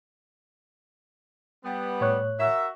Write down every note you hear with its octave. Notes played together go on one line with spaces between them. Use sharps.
G3 B3
A2 C#5 F#6
F#4 A#4 E5